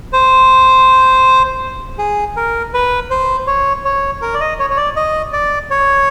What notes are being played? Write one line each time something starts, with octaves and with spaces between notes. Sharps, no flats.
C5
G#4
A#4
B4
C5
C#5
C#5
A#4
D5
D#5
C#5
C#5
D5
D#5
D5
C#5